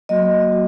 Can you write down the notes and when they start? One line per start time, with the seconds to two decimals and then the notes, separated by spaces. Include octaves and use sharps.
0.09 F#3 A#3 F#4 D#5
0.52 F#4